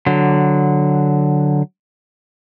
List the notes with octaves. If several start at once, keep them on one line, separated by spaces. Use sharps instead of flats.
D3 F#3